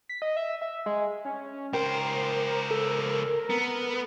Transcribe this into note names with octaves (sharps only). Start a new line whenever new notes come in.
B6
D#5
E5
E5
G#3
C#4
C#2 A#4 C5 G5
A4
B3